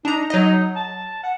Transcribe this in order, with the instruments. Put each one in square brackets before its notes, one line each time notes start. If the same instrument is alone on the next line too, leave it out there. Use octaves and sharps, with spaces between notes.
[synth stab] D4 A#5 [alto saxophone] D#4
[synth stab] F#3 D#5 [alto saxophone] D#4
[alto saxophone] A5
F#5